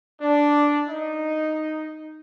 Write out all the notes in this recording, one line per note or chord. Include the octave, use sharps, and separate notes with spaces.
D4
D#4